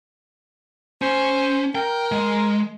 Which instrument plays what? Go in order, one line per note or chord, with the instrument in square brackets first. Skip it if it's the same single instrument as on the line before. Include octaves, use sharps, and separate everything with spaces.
[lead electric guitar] C#4 [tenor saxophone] C5
[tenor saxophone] A#4 [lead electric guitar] G5
[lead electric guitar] G#3